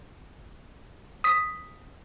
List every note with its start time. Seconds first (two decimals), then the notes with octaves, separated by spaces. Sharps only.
1.24 D#6 B6